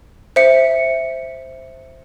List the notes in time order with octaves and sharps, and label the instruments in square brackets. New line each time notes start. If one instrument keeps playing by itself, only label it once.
[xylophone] C5 E5 C#7